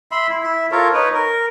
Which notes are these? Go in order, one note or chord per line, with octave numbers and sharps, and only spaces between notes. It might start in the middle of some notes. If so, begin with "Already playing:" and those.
E5 B5 C6
E4
E4 E5
F4 A4 A#4 C#5
D#4 B4 C#5
A#4